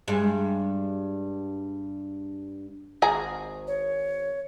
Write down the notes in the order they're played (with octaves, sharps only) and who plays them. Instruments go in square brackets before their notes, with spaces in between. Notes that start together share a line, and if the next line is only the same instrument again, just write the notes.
[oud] G2 G#3
[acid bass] G#1 [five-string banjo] G#4 G#5 A#5
[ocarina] C#5